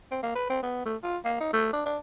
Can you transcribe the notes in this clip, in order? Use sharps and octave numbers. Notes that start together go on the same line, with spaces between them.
C4
A#3
B4
C4
B3
A3
F4
A#3
D#4
A3
D4
D4